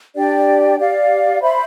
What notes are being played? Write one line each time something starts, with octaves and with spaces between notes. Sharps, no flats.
D4 G4 D5 G5
G4 D5 F5
C5 E5 B5